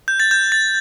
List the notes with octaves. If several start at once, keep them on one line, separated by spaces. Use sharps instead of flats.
G6
A6
G6
A6